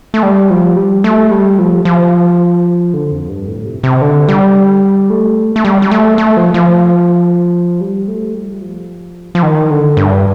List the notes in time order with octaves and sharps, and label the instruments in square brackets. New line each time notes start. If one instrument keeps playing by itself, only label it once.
[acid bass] A3
G3
F3
G3
A3
G3
F3
F3
D3
F2
G2
A2
C3
C3
D3
G3
A3
A3
G3
G3
A3
A3
F3
F3
G3
A3
G3
F3
F3
D#3
D3
G2